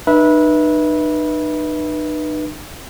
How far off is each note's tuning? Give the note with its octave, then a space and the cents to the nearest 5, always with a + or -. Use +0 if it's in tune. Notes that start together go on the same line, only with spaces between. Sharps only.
D#4 -40 B4 -20 E5 -10